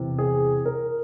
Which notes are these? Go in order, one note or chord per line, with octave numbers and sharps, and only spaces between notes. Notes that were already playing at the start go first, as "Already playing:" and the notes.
Already playing: E2 C3 E3
G#4
A#4